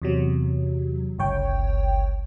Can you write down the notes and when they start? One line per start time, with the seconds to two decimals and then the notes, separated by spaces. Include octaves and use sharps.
0.02 E2 C3 F#3
1.18 G1 C#2 C#5 G5